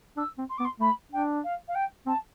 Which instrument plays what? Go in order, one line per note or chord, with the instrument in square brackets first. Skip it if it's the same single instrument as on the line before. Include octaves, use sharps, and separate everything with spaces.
[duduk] D4 [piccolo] E6
[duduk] C4
[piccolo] C6
[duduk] B3 [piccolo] D6
[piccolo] C6
[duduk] A3 [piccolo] B5
[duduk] D4 [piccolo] G5
[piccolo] F5
F5
G5
[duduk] C4 [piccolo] A5